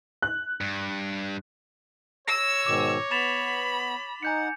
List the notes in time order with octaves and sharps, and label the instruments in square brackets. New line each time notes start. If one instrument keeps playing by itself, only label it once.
[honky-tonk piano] F#6
[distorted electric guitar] G2
[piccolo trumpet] C#5 [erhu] E6 [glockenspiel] A#6
[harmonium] G#2 B2 D#3 [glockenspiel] D6
[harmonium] B3 [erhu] B5 [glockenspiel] A6 E7 F7
[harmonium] D#4 F#5 [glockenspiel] G#5 G6 C#7